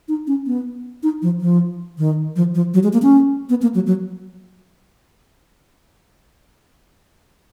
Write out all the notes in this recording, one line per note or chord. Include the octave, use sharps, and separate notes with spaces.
D#4
C#4
B3
D#4
F3
F3
D#3
F3
F3
F#3
G#3
A#3
C#4
B3
A#3
F#3
F#3